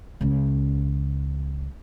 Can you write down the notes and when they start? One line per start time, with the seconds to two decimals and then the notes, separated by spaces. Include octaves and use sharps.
0.21 C#2 C#3